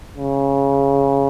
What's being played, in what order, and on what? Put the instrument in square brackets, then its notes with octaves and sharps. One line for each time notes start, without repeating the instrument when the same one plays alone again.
[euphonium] C#3